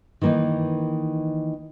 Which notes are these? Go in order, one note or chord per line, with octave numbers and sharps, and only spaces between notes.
D#3 E3 A#3 C#4 D#4